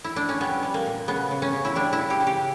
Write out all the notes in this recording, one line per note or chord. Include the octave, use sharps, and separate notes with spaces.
E4
D4
C#4
G3 B3
G3
A#3
A#2
C#3 B3
C#3
C#4
C#3
E4
G3 D4
E4
C#3
G4
C#3
G4